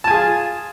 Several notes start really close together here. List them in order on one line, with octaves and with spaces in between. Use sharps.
A5 G#5 G#4 F4